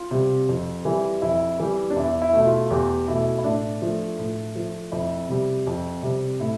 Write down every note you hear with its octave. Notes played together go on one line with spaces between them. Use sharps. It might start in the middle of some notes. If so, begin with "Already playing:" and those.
Already playing: F4
C3 G3
F2
E3 G3
F2 E4
E3 G3
D4
E2 E4
E4
B2 A3
E4
F4
E2 G4
B2 A3 E4
E4
A2 D4
F3 A3
A2
F3 A3
F2 E4
C3 G3
F2
C3 G3
A2 E4